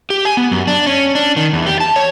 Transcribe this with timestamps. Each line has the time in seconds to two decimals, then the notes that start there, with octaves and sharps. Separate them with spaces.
0.10 G4
0.25 G#5
0.37 B3
0.51 F#2
0.67 D4
0.86 C#4
1.15 D4
1.36 D#3
1.53 E2
1.66 G4
1.80 A5
1.96 C#5